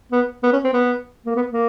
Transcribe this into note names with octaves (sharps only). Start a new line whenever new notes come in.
B3
B3
C#4
C4
B3
A#3
B3
A#3